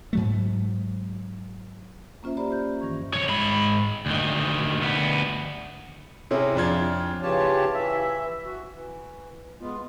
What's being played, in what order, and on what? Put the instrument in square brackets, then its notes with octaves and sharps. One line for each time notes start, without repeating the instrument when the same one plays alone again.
[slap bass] G#2 F#3 A3
[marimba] A#3 C#4 F4 C5 E5
G4 C5 D5 A#5 B5
G6
G2 D#3 E3 C#6
[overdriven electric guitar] C2 C#5
G#2 B5
D2 D#3
D2 B3
[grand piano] C3 C4 C#4 E4 G#4
F2 D4 F4 G#6
[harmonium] C#3 E3 F4 G4 C#5 A5
E3 E5
F#4
E3
G#3 B3 F4